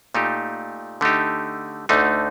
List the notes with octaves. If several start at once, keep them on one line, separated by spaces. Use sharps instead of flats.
A#2 A3 D#4 G4
D3 A3 D#4 G4
D2 D3 A3 D#4